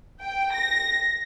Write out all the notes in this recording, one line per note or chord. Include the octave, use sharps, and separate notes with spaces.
G5
A#6